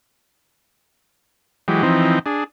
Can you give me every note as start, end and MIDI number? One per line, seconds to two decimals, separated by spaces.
1.68 1.83 52
1.68 1.83 54
1.68 1.83 56
1.68 1.83 67
1.83 2.19 52
1.83 2.19 53
1.83 2.19 60
1.83 2.19 63
2.26 2.44 62
2.26 2.44 68